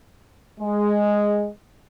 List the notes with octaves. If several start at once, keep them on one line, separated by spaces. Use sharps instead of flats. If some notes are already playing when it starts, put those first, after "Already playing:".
G#3